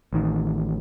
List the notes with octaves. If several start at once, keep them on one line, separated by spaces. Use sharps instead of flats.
A1 D#3